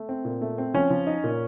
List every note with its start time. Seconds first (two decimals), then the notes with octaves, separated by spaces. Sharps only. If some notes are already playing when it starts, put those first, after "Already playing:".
Already playing: A3
0.09 C4
0.25 A#2
0.41 A3
0.58 C4
0.74 F3 C#4
0.90 F3
1.07 D#4
1.24 A#2